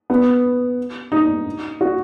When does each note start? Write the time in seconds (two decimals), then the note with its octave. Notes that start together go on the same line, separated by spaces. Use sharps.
0.10 B3
1.12 D#4
1.81 F#4